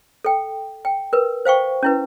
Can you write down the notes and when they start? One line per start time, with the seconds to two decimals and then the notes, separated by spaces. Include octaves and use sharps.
0.25 A4 G5
0.85 G5
1.13 A#4 B4
1.45 C5 F5 G5 C#6
1.83 C#4 E4 B4